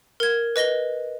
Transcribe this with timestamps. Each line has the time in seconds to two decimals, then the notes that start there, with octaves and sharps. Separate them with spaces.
0.20 A#4 G#6
0.56 B4 D#5 A#6 G7